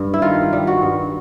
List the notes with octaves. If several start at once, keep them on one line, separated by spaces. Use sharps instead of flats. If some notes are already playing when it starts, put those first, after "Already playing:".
Already playing: G2
E4
D#3 F4
G3
F#4
G2